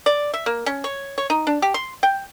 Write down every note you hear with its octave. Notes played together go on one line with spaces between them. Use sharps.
D5
E5
A#3
C#4
C#5
C#5
D#4
D4
G4
C6
G5